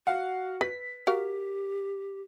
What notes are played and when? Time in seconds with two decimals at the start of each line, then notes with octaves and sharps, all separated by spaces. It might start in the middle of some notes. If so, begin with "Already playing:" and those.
0.07 F#4 F5 F#5
0.61 B4 B6
1.07 F#4 G4 A#4 F5